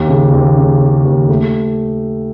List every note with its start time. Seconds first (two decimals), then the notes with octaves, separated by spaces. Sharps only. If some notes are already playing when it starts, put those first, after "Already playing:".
Already playing: D#2
0.08 C#3
0.34 D#2
0.57 C#3
0.81 C#3
1.05 D#2
1.29 A3